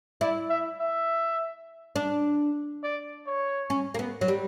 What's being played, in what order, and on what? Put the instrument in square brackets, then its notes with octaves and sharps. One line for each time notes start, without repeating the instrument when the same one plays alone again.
[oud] E4 [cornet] D5
[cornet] E5
E5
[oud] D4
[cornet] D5
C#5
[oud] C#4
A#3
B3
F#3
G3